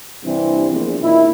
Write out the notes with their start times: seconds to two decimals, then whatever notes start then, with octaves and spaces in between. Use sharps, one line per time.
0.24 G2 C3 E3 C4 D4
0.71 A#1 E2
1.02 A#2 D#3 E4